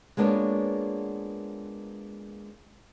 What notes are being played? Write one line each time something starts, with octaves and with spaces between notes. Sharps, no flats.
G#3 A#3 B3 D4 F4 C#5